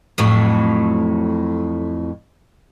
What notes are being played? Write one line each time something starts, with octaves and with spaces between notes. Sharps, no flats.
F2 A2 F#3